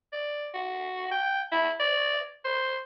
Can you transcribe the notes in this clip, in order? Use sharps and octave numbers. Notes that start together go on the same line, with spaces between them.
D5
F#4
G5
E4
D5
C5